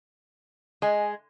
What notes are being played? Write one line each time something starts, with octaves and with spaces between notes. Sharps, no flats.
G#3 D#5 G#5